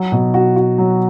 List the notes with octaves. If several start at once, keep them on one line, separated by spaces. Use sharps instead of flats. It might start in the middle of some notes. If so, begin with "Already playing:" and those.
Already playing: F#3
B2
F#4
F#4
F#3